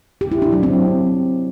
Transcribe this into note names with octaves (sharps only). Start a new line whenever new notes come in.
G4
E4
D4
F#3
C4